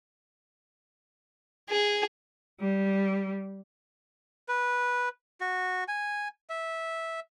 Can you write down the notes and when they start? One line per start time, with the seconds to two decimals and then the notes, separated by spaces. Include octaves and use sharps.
1.70 G#4
2.61 G3
4.48 B4
5.41 F#4
5.88 G#5
6.50 E5